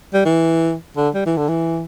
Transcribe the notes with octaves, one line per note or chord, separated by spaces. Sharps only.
G3
E3
D3
G3
E3
D3
E3